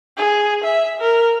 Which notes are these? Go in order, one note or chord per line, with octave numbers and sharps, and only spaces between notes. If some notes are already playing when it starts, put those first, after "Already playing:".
G#4
E5
A#4